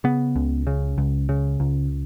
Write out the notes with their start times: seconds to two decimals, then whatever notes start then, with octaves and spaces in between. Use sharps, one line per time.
0.04 C#3 B3
0.36 C#2
0.67 C#3
0.98 C#2
1.29 C#3
1.60 C#2